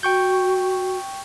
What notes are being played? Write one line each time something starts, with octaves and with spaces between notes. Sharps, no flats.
F#4 G5 C#6 G6